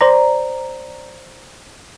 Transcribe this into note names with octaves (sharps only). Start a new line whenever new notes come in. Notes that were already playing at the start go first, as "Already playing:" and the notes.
C5 D5 A#5